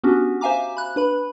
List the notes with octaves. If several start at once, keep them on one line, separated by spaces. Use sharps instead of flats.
B3 C#4 D4 F#4 G4
C5 E5 F5 G#5 A#5 D6
B5 F#6
D4 B4 B5